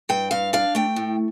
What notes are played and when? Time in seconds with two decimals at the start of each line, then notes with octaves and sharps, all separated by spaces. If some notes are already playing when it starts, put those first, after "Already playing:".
0.09 G2 G5
0.31 G2 F5
0.53 D4 F5
0.75 A3 G5
0.96 A2